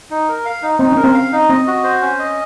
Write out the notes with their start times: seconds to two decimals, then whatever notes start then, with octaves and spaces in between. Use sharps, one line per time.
0.11 D#4
0.28 A#4
0.45 F5
0.63 D#4
0.79 C4 D#4
0.92 C#4 A#4
1.04 C4
1.14 F5
1.32 D#4
1.49 C4 D#5
1.67 F#4
1.84 C5
2.01 C#4
2.19 D#5